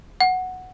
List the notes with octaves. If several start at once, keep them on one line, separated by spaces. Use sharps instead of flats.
F#5